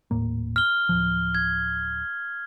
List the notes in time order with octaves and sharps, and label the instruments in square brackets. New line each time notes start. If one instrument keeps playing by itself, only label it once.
[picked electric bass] D#1 A2 A#3
[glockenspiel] F6 G7
[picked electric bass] D1 B1 F3
[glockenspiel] G#6